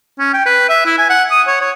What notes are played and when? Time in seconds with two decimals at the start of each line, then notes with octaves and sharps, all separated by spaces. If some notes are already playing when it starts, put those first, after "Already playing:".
0.19 C#4
0.34 G5
0.46 B4
0.69 E5
0.86 E4
0.98 G#5
1.10 F#5
1.31 D#6
1.47 C#5
1.61 C#5